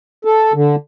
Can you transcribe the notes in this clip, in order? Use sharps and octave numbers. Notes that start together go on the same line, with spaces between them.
A4
D3